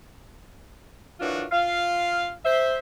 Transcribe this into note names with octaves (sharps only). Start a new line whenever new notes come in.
F#2 E3 D4 F4 F#4
F4 F5
C5 E5